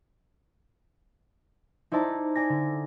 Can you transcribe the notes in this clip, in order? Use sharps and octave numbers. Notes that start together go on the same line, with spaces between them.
D#4 E4 C5 D5 A5 A#5
D5 G#5 A#6
D3